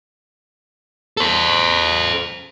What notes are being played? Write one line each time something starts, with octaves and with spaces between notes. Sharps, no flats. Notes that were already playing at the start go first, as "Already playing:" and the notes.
A4 C5